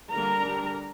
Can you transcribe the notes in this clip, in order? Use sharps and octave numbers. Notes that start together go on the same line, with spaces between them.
D3 G3 A#3 A#4 A#5
D3 G3 D4